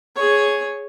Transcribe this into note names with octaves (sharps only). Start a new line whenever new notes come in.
G#4 C#5